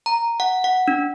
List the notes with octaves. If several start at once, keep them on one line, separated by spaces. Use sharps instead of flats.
A#5
F#5
F#5
D4